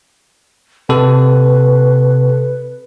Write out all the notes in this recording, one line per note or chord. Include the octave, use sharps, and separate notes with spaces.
C3 A4 B4